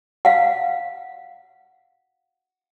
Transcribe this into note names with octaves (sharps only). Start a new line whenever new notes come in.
F5 F#5